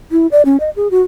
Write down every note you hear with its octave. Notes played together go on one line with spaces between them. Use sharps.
E4
D5
C#4
D#5
G#4
F#4